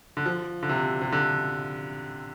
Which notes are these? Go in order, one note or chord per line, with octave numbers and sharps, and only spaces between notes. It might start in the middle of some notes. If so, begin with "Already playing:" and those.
D3
F3
D3
C3
C3
D3